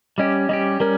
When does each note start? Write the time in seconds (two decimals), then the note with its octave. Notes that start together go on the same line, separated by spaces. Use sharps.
0.18 G3 C#4 G4 D#5
0.49 G3 C#4 G4 D#5
0.80 G3 C#4 A#4